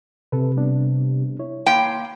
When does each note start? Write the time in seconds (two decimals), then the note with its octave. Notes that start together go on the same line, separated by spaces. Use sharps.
0.32 C3 A4 B4
0.56 G3 B3 D4
1.39 E4 C#5
1.66 A#3 G5 C6